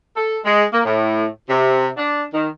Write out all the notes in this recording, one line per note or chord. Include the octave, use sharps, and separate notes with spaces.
A4
G#3
A#3
A2
C3
D4
D#3